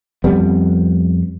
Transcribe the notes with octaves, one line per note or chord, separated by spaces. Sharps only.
F2 G3 B3